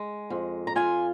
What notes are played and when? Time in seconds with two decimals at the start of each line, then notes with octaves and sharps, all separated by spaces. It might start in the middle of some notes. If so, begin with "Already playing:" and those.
Already playing: G#3
0.30 F2
0.67 A#5
0.76 F4 G#5